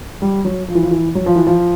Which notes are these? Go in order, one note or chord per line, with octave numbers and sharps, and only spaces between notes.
G3
F#3
F3
E3
F3
E3
F#3
F3
E3
F3